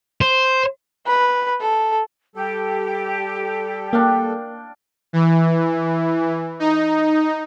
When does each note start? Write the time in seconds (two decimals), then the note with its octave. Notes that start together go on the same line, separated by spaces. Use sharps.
0.21 C5
1.07 B4
1.61 A4
2.35 G3 G4 A4
3.93 A#3 D4 F5 G5
5.13 E3
6.59 D#4